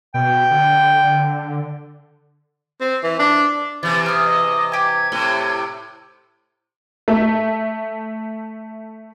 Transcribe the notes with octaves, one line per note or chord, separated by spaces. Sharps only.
B2 G5
D3
C4
E3
D4
C3 E3 A6
G#4 D#6 F6
D#5
G4 G#5 G#6
A2 C3
A3 E5